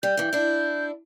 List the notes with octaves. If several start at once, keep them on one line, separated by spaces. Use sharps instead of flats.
G3 G6
G2 E3
D4 E4